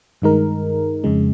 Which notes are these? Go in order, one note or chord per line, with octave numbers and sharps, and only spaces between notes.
G2 D#3 G#3 D#4 A#4
F2 C#3 G#3